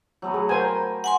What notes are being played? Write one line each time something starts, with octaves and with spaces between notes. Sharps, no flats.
F#3 A3 B3
G#4
A#4 C5 G5 G#5 A#5
F#5 G#5 C6